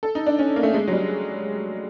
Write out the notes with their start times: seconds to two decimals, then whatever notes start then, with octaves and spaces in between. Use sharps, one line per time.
0.03 A4
0.15 D#4
0.26 D4
0.39 C#4
0.56 A#3
0.63 A3
0.74 G#3
0.88 F#3
0.93 G3